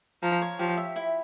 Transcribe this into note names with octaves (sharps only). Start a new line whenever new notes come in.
F3 A#5
C#5
F3 G4
E5
E4